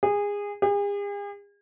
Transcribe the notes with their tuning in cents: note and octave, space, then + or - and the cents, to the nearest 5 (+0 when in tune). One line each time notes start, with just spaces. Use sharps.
G#4 -25
G#4 -45